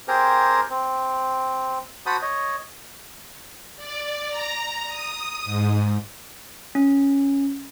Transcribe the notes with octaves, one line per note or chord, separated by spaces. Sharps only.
C4 G4 G#4 A#4 C5 A#5
C4
F#4 C5 A5 B5 D#6
C#5 D#5
D5
A#5
D#6
G#2
C#4